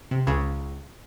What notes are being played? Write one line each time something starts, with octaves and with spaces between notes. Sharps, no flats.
C3
C#2 C#3